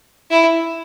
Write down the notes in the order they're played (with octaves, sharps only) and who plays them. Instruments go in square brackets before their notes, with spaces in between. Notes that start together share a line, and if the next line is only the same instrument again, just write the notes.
[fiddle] E4